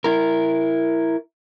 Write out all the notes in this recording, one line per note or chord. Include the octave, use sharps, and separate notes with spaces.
E4 A#4